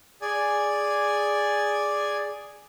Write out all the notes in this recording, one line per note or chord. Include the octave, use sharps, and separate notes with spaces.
G#4 D5 G#5